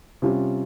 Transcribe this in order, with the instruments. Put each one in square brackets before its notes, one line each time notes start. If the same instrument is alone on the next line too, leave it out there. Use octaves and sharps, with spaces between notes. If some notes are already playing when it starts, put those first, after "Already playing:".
[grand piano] C3 G3 C#4 F4